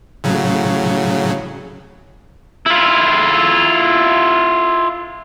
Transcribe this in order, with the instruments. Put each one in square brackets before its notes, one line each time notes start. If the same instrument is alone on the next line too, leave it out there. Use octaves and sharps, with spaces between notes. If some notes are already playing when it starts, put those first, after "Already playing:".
[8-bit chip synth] A2 C#3 F#3
[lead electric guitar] E4 F4